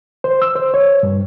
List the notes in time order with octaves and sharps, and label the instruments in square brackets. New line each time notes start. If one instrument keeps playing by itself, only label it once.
[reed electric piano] C5
E6
C5
C#5
G2